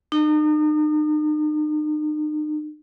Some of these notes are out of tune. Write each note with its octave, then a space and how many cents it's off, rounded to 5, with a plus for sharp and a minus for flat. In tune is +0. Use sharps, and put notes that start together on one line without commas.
D#4 -40